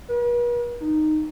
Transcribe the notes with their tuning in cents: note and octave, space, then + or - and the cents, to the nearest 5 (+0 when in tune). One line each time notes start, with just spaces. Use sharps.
B4 -45
D#4 -10